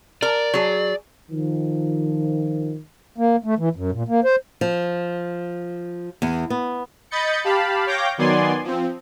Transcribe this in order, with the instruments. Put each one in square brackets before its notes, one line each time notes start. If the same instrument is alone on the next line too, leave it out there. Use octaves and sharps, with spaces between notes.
[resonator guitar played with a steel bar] A#4 [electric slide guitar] D5
[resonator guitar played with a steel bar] F#3 G#4
[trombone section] D#3 F3
[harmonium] A#3
A3
E3
F#2
A#2
A#3
C5
[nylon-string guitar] F3
E2
B3
[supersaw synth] D#5 B5 G6 A6 C#7
G4 F5 A5 B5
C#5 F5 G5 D6 G6 A#6
D#3 F#3 B3 D5 G#5 C6
F3 C4